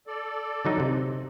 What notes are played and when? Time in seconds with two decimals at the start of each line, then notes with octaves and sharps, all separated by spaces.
0.07 A4 D5
0.65 D3 F#3 D#4
0.80 C3